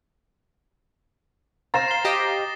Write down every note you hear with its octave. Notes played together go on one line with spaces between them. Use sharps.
C5 F5 A#5 A6 A#6 E7
C7 G7
G4 D#5